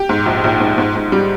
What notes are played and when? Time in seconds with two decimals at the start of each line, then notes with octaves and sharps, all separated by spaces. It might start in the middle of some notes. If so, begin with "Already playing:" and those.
Already playing: G4
0.09 G#2
0.26 A#1
0.44 A#1
0.60 G#2
0.78 G#2
0.96 G#2
1.12 G3